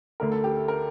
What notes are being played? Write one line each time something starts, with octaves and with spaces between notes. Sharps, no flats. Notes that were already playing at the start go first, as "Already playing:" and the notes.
D2 D3 A3 A#4
A4
G4
A4
A#4